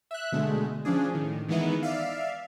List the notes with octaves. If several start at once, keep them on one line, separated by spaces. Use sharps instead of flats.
E5 F#6
B2 D3 G#3 A3
F3 C#4 D4 G#4
A2 D#3
D#3 E3 G#3 B3 D#4 E4
D5 E5 F5